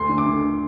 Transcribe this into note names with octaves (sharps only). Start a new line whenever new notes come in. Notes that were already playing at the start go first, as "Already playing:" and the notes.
Already playing: D2 C6
D3
D6
D3